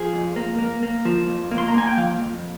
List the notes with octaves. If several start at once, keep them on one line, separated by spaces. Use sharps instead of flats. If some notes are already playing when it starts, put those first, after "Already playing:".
Already playing: F3 G#4
F2
A#3
A#3
A#3
F3
F2
A#3
C6
A#5
A#3 G#5
G5
F3 F5
F2